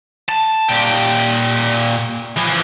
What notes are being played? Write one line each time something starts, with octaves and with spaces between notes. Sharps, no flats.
A5
A#2 G4
E3 F3